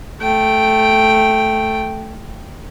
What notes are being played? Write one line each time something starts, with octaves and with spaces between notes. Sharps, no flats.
A3 G5